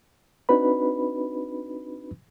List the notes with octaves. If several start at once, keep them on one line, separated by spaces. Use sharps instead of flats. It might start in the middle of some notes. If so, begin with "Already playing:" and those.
C4 D4 D#4 F#4 B4 B5